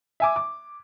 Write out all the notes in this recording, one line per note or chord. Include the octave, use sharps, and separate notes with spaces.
E5 G#5 D6
D6